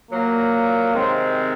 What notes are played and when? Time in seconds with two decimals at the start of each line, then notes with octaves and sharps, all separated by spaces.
0.11 A#2 F#3 A#3
0.92 C3 D#3 G#3 C4